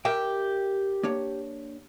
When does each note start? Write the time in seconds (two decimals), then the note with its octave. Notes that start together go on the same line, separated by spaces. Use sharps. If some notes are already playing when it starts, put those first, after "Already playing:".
0.05 G4 A#4 E5 G5
1.03 A#3 D4 C#5